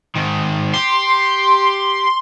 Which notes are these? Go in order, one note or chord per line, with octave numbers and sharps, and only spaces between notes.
G#2 D#3
G4 C6